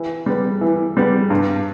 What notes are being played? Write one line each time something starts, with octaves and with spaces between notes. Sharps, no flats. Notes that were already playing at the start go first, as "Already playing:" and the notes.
Already playing: E3
G3 B3
E3
G3 B3
G2